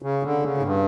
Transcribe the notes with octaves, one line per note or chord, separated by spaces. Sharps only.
C#3
D3
C#3
G#2
G2